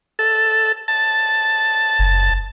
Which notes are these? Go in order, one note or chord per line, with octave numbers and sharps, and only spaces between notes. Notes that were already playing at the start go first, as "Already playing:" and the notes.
A4
A5
F#1